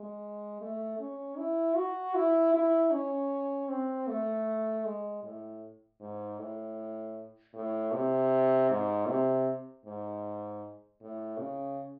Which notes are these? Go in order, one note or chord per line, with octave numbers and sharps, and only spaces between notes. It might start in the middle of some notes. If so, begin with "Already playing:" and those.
Already playing: G#3
A3
C#4
E4
F#4
E4
E4
C#4
C4
A3
G#3
A2
G#2
A2
A2
C3
G#2
C3
G#2
A2
C#3